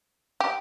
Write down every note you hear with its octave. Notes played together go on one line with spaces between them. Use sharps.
G4